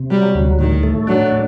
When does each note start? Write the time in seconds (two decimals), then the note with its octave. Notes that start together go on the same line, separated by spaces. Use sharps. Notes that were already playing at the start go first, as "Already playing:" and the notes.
Already playing: C3
0.10 F#3 G3
0.35 D2
0.59 A2 D#3
0.83 A3
1.07 F#3 D4
1.32 A2